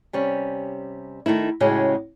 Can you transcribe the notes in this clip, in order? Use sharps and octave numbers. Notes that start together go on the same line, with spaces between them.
C3 G3 C#4
D#3 A3 D#4 E4
A2 C#3 G#3 C#4 F#4 G4